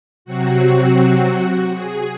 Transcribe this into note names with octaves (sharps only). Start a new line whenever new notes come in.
C3 F#3 C4 F#4
G#4